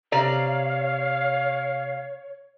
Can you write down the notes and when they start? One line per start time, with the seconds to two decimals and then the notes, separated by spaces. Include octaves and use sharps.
0.12 C3 C#5 D5 F5 A#5